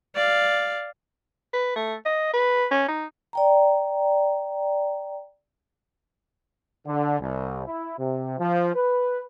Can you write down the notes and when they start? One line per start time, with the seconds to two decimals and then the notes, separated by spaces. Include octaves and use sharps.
0.16 D5 F5
1.53 B4
1.76 A3
2.05 D#5
2.33 B4
2.71 C#4
2.88 D#4
3.33 D5 G5 A#5
6.87 D3
7.20 C2
7.66 E4
7.98 C3
8.39 F3
8.74 B4